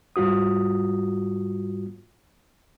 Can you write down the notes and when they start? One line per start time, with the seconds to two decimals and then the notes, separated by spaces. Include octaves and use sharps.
0.16 G#2 G3 F4 F#4 D#6